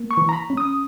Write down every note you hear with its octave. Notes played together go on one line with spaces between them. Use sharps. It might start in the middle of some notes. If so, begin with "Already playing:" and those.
Already playing: A#3
C#6
E3
A#5
B5
C#4
D#6